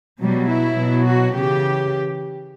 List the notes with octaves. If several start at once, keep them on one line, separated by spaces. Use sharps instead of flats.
B2 F#3 G3
E4
B2 F#3
F#4
C#3 E3 G4